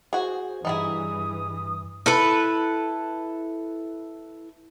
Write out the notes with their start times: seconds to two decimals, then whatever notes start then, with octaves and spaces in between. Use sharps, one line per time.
0.13 F#4 G#4 C5
0.65 G2 E3 D#4 E4 G#4 D#6
2.06 E4 A4 B4